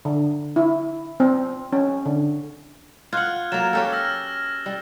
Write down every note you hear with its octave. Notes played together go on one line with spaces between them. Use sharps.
D3
E4
C4
C#4
D3
F4 F#5 F6 F#6 G#6
F#3 A#3 A6 E7
C#4 G4 A4
E6 F6 A#6
G3